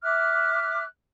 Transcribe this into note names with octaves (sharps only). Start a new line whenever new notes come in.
E5 D6 F6 F#6